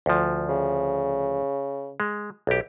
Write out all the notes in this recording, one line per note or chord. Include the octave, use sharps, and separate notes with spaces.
D2 F3
C#3
G#3
B1 G4